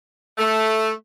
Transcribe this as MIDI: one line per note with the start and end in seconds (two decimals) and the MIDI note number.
0.38 0.91 57